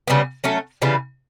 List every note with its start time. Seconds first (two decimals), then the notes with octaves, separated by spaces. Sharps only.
0.07 C#3 G3 B3
0.44 F#3 A3 C#4
0.82 C#3 E3 G3 B3